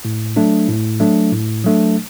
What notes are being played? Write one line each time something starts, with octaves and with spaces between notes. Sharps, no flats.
A2
F#3 A3 D4
A2
F#3 A3 D4
A2
F#3 A3 D4